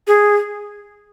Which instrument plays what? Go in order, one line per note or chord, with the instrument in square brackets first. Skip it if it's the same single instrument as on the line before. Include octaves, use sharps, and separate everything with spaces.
[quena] G#4